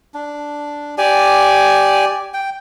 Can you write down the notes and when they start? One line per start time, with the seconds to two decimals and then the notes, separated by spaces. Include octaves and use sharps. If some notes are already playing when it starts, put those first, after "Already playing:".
0.14 D4
0.98 G4 D5 G#5
2.34 G5